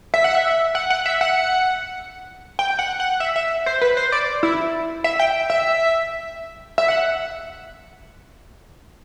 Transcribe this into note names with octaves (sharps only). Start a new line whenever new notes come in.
E5
F#5
E5
F#5
F#5
E5
F#5
G5
F#5
F#5
E5
E5
C5
B4
C5
D5
E4
E5
G5
E5
E5
F#5